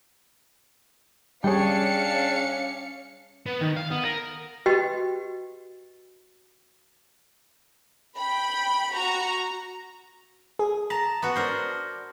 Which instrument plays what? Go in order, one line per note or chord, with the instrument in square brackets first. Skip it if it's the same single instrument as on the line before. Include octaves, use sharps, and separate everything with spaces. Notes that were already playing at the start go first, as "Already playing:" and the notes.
[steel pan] G3 C#5 [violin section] C#4 F5 C#7 [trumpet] D4 [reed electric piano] G#4 G5
[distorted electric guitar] B3
D#3
F5
B3
A#4
[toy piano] F#4 G4 B4 D#5 G5
[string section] G5 B5
F#4 A#5
[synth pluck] G#4
[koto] A5 [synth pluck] A#5
[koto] B3 F#4
D4 A#4 C5